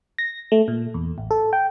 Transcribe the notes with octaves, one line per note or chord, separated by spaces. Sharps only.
A#6
A3
A#2
E2
A1
A4
G5